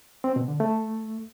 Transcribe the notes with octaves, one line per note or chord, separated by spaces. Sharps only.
C4
B2
D3
A3